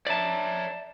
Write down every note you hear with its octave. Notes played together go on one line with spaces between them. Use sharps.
C#5 D5 E5 A5 A#5